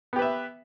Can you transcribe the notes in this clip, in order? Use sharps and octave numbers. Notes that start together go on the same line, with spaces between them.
B3 G4 B4 E5